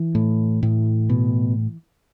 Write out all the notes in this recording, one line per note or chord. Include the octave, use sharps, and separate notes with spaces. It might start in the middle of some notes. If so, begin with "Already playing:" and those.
Already playing: E3
A2
A2
B2